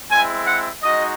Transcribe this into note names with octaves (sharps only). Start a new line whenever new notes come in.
G#3 C4 E4 G#5
F#5
G#3 D#4 F#4 D#5